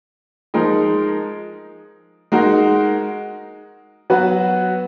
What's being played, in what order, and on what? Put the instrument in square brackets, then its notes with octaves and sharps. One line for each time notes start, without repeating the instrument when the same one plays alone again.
[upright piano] F3 G#3 D#4 A#4
G#3 D#4 F#4 A#4
F#3 B3 F#4 B4